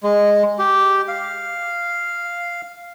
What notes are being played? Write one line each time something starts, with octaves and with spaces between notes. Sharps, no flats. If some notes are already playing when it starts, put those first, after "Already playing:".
G#3
G4
F5